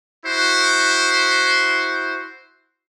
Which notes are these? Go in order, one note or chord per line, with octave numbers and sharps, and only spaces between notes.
E4 F#4 C5